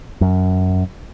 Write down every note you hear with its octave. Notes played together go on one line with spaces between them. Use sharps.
F#2